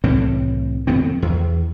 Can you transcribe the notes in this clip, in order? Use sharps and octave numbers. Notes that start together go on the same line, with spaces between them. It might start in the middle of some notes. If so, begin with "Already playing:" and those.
C2 A2 E3 C4
F2 D#3 B3 C4
E2